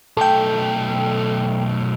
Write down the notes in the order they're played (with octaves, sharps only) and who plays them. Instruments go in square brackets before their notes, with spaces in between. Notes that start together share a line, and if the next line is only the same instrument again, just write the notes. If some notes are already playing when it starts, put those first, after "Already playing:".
[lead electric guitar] B1 A3 [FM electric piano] A4 G5